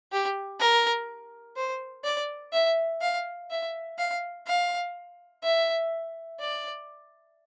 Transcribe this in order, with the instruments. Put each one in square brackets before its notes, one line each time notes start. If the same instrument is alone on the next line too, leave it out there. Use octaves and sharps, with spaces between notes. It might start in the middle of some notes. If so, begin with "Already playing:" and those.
[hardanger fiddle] G4
A#4
C5
D5
E5
F5
E5
F5
F5
E5
D5